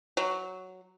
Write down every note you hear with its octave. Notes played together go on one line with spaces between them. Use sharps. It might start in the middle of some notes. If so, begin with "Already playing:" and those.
F#3